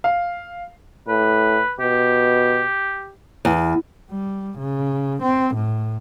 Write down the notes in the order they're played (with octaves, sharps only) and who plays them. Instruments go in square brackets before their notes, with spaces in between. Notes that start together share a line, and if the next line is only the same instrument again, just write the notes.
[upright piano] F5
[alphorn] A2 [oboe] B4
[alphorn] B2 [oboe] G4
[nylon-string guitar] E2
[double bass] G3
C#3
C4
A2